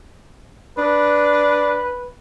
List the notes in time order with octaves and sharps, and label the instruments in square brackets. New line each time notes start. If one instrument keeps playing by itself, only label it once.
[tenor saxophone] D4 [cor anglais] B4